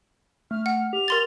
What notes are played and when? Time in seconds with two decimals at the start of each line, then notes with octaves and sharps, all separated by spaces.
0.51 A3 F6
0.66 F#5 F6
0.93 G4 F7
1.08 A#4 C6 A6